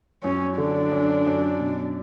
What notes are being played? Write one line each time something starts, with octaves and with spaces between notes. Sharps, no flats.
F#2 C#4
D3 D4
F#2
F#2
B2